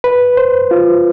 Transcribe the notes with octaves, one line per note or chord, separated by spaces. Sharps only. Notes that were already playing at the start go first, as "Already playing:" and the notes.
B4
C5
F4